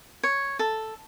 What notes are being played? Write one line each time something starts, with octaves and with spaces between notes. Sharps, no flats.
C#5
A4